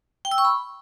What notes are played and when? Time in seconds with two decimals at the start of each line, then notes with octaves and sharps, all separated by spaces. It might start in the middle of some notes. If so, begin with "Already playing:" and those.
0.25 G5
0.31 E6
0.38 C#6
0.45 B5